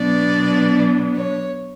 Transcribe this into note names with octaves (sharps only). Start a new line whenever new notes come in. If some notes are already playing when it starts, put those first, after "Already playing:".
Already playing: B2 F#3 B3 D4 D5
C#5